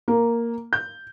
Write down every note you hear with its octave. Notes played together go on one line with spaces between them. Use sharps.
A#3
G6